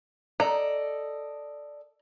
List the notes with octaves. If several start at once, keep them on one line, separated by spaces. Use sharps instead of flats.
A4 D5 D#5 A#5